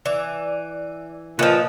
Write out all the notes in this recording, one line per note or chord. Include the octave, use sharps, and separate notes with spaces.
E3 D5
A#2 E3 F3 B4 D#5